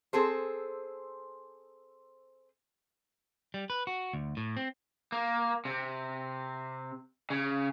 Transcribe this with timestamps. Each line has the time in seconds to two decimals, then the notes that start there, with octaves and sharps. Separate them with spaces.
0.13 C4 G#4 A4 C5
3.54 G3
3.70 B4
3.87 F#4
4.13 D2
4.37 A2
4.57 C4
5.12 A#3
5.65 C3
7.30 C#3